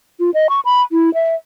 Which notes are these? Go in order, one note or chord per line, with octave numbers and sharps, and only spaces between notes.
F4
D#5
C#6
B5
E4
E5